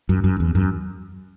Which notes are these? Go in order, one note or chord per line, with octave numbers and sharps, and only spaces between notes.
F#2
F#2
E2
F#2